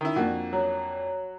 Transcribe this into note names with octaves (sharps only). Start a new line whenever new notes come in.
D#3 E4
F2 A#3 D4 F#4
F#3